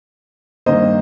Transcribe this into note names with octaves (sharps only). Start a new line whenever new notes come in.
G2 D#3 A#3 C5 D#5